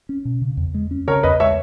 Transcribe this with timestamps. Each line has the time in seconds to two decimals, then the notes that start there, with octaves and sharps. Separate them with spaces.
0.09 C#4
0.25 B2
0.41 C#3
0.57 E2
0.74 G#3
0.91 C#4
1.08 C#3 A#4 C#5
1.23 E2 B4 D#5
1.40 G#3 C#5 E5